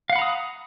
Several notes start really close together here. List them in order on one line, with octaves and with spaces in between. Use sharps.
F5 F#5 B5 A#5 D#6